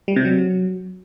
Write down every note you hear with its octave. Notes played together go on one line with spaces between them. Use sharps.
G3
C3
F#3